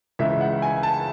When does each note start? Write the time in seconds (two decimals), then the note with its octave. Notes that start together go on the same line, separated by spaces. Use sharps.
0.19 C#2 C#3 E3 G#3 E5
0.41 F#5
0.62 G#5
0.83 A5